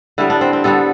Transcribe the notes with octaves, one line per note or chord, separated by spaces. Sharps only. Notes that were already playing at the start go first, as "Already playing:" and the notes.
D3 G3 B3 E4
D4
C4
C4
D3 G3 B3 A4